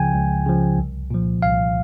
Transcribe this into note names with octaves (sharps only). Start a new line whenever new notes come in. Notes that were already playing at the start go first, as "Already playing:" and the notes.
Already playing: C#2 C#3 F3 G5 G#5
C#2
C#3 F3
C2
A#2 F3
C2 F5